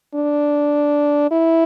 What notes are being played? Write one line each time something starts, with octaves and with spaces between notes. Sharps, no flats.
D4
E4